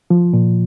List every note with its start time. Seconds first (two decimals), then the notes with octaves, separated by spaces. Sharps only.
0.10 F3
0.33 A#2